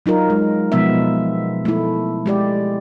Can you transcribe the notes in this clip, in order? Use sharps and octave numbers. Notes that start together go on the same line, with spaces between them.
F#3 D#4 F4 A#4
G#3
B2 F3 G#3 B3 E5
A3 E4
G#3 G4 D5